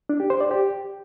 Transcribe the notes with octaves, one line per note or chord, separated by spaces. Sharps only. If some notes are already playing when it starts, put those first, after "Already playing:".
D4
G4
C5
D5
G4